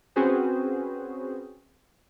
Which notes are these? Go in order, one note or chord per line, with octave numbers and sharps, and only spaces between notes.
C4 C#4 F#4 G#4 B4 C5